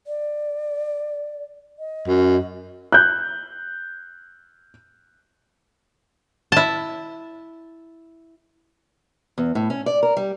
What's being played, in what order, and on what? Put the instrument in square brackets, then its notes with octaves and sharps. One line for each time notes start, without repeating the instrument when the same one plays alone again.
[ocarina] D5
D#5
[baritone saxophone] F#2
[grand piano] F#6 G6
[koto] E4 A5
[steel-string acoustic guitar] E2
A2
C#4
D5
A#4
G3